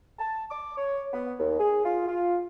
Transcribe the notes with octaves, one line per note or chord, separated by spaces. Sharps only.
A5
D6
C#5
B3
D#2
G#4
F4
F4